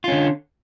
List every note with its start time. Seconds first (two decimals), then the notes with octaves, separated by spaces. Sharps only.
0.04 F4
0.08 C#4
0.12 D3